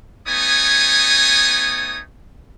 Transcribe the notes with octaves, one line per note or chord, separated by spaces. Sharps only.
A3 B3 D#4 C#5 G#5 D#6